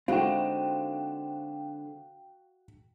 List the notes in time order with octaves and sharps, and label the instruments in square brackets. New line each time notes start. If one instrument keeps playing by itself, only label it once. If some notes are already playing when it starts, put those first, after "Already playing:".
[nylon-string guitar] D3 G#3 F4 [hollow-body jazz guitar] C4 D#4 [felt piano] F#4 [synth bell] F5 G5